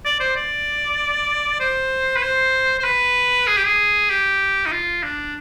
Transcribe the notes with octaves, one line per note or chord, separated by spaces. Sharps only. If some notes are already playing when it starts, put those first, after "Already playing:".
D5
C5
D5
C5
B4
C5
C5
B4
G#4
G4
G#4
G4
D#4
F4
D4